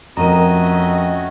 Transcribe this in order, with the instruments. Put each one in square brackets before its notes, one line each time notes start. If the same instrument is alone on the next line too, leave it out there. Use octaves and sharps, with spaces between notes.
[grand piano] F2 A#4 D#7 [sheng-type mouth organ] A3 C#4 F#4 [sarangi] D#5 [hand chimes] A#5